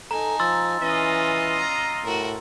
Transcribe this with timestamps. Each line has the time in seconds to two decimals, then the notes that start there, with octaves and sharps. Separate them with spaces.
0.11 D#4 A4 G#5 A#5
0.40 F3 C6 E6 A6
0.81 E3 C#4 F4 D#5
1.57 A#5
2.04 A2 F#4 A#4